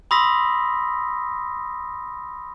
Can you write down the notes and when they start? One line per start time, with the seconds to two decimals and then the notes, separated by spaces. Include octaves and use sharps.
0.11 B5 C6 D#6 E6 A#6 B6